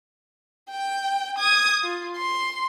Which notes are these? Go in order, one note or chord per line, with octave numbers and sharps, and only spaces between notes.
G5
D#6 G#6
F4
C6